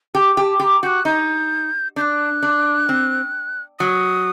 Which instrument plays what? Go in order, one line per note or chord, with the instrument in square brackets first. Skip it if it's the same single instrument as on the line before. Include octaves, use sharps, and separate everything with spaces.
[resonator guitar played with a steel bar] G4 [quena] G5 A5
[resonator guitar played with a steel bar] G4 [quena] A5
[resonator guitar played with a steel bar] G4 [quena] C6
[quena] A#5
[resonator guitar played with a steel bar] F#4 [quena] G6
[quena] F#6
[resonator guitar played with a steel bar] D#4 [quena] G6
[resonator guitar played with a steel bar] D4 [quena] G6
[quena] F#6
[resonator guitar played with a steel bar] D4
C4
[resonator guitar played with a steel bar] F#3 [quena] D#6